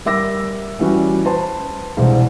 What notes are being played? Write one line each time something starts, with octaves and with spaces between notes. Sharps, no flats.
G3 A#4 E5 D6 E6 A#6
E3 G3 C#4 F#4
B4 C5 A5 C6
E1 C2 C5